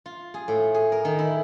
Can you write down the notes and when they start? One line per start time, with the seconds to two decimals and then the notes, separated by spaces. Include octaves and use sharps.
0.06 F4
0.34 G#4
0.48 A2
0.74 G#4
0.92 A#4
1.05 D#3
1.19 E4